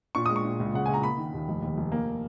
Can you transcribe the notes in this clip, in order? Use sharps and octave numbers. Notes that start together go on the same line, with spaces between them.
A#2 C#6
G#3 D#6
C#6
A#2
C#2
C#3 F#5
C#2 G#5
A#5
A#3 B5
D#3
D#2
F1
D#2
F1
A#3